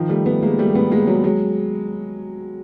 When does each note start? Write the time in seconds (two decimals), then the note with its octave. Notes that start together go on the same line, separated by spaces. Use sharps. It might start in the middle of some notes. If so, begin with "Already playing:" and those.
Already playing: D#3 F3
0.09 G3 A3
0.26 A3 B3
0.43 G#3 A#3
0.58 G3 A3
0.74 A3 B3
0.91 G#3 A#3
1.07 F#3 G#3
1.24 F#3 G#3